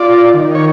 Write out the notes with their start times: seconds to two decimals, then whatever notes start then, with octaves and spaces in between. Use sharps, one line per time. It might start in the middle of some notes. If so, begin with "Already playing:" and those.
Already playing: F4 D5
0.34 D#3
0.55 C#5